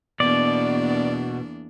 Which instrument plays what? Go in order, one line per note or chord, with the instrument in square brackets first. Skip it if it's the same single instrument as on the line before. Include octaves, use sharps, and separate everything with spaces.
[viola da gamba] E2 A#3 D4 [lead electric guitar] B2 [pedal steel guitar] D5